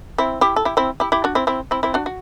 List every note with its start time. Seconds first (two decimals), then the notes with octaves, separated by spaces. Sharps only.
0.18 C4 E4
0.41 E4 G4
0.56 A4
0.65 E4 G4
0.77 C4 E4
1.00 E4 G4
1.12 E4 G4
1.24 D4 F#4
1.35 C4 E4
1.47 C4 E4
1.71 C4 E4
1.83 C4 E4
1.94 D4 F#4
2.06 F#4